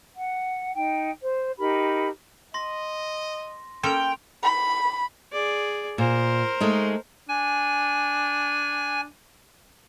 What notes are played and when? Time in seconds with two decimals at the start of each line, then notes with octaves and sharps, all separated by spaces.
0.15 F#5
0.74 D#4 G5
1.21 C5
1.58 D#4 G4 A#4 B5
2.54 D#5 C6 A#6
3.83 A#3 C#4 A4 G5 C6 D7 F7
4.43 B5
5.32 G#4 D5
5.98 A#2 A#4 C5
6.60 G#3 A3 D#4
7.29 D4 G#5